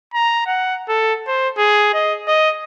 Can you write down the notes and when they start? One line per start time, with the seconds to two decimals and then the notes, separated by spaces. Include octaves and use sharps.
0.14 A#5
0.47 F#5
0.88 A4
1.27 C5
1.58 G#4
1.94 D#5
2.28 D#5